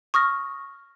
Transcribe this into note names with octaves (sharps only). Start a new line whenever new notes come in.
C#6 D#6 F6 A#6